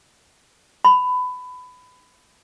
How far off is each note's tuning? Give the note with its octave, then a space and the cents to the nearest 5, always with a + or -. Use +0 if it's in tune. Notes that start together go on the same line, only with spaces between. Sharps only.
B5 +20